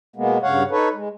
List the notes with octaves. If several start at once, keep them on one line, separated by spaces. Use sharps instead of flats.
B2 G#3 A#3 B3
G2 C#3 C#5 F5 F#5
D#4 A4 B4 C#5
G#3